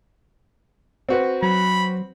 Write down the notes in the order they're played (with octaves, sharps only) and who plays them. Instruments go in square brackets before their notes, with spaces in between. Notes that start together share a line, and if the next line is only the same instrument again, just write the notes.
[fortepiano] C4 F#4 B4
[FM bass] F#3 [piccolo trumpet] B5